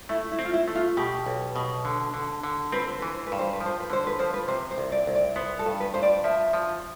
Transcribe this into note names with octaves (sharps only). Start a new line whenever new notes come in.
A3 E4
E4
C4
F4
E4
A3
F4
B2 G4
B1
B2
D3
D3
D3
C4 B4
C5
E3 B4
C5
B4
G2
C5
B4
F3
C5
B4
D3 C5
B4
F3 C5
B4
C3 C5
C5
C2
D5
C2
D5
B3 C5
A4
G2
B4
G2 C5
D5
F3 E5
F3